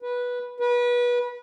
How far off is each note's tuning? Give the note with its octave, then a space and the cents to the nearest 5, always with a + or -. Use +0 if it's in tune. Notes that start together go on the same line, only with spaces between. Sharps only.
B4 -10
B4 -25